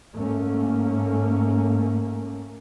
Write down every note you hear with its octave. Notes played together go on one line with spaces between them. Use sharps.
G#2 A3 A#3 C#4